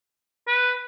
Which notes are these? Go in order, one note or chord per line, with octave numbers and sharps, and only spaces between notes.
B4